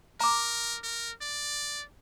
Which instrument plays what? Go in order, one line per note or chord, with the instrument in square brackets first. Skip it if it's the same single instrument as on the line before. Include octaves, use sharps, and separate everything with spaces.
[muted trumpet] A#4 [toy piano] A#5 D6
[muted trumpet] A#4
D5